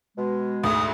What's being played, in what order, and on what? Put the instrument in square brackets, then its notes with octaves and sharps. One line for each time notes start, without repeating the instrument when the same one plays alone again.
[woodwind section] B2 G#3
[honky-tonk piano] D2 G#2 [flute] D#6